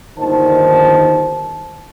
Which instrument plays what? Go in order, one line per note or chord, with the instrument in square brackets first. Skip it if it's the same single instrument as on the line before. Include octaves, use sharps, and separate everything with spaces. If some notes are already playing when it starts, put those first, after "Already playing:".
[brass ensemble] G1 D#2 D3 D#3 C5 A5